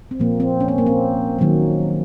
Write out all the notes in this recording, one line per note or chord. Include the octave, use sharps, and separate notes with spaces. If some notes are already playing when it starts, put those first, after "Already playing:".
C4
A#2 F3 A#3
C4
C#4
C4
A#3
C4
D#3 F#3 A#3